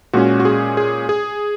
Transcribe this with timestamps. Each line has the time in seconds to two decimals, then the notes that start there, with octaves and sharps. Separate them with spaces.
0.13 A#2 G#3 C#4 F#4
0.40 F#4
0.45 G#4
0.77 G#4
1.09 G#4